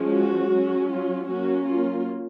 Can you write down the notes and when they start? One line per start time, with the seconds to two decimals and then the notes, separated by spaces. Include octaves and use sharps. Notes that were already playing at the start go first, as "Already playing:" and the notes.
Already playing: F3 G#3 C#4
0.12 F#4
0.50 F#3 C#4
0.88 F4
1.27 F#3 A#3 C#4 F#4
1.67 F4